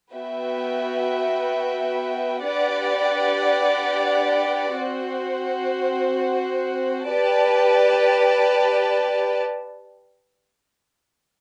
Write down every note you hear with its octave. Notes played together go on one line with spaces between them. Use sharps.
B3 F#4 B4 E5 G5
D4 G4 B4 D5 F#5
C4 F#4 C5 F#5
G4 B4 D5 A5